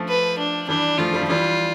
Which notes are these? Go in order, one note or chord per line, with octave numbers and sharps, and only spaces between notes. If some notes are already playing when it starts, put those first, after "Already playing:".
Already playing: F3 A3
B4
D4
E3 G3 D4
F3 A3 F4
G3
F3
E3 G3 F4